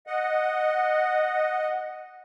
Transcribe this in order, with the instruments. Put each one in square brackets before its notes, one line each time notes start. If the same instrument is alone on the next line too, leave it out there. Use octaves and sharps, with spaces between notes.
[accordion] D#5 F#5